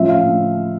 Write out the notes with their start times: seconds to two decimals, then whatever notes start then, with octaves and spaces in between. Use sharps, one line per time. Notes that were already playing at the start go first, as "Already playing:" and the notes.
Already playing: A2 F3 C#4 F4 E5
0.09 F5
0.25 A2